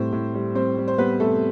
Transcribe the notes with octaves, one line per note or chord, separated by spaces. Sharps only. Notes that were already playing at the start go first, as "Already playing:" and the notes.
Already playing: A2 G3 C4 C5
A2
G3
G3 C4 C5
G3
C5
G3 B3 B4
C3 A3 A4